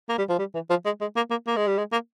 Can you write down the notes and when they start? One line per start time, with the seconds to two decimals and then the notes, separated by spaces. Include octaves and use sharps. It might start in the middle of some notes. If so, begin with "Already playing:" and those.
0.09 A#3
0.18 G3
0.29 F3
0.39 G3
0.54 E3
0.70 F3
0.85 G#3
1.01 G#3
1.16 A#3
1.30 A#3
1.47 A#3
1.56 G#3
1.67 G3
1.78 G#3
1.92 A#3